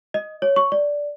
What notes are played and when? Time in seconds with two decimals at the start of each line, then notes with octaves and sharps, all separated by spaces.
0.14 D#5
0.42 C#5
0.56 C#6
0.72 D5